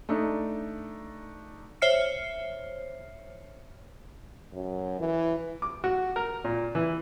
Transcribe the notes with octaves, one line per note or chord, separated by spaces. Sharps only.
A3 D4 D#4
C5 C#5 E5 F6 C7 C#7
F#2
E3
D6
F#4
A#4
A#2
E3